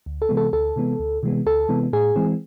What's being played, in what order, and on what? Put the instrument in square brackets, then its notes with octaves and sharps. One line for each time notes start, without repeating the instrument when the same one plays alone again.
[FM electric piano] D2
A4
C3 E3 G#3 B3
A4
D2 A4
C3 E3 G#3 B3
D2
C3 E3 G#3 B3
D2 A4
C3 E3 G#3 B3
A2 G#4
E3 G#3 C4